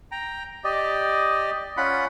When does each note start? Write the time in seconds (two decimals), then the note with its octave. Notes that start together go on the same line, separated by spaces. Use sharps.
0.12 G5 A#5
0.64 G4 D5 D#5
1.77 C#4 F4 F#5 B5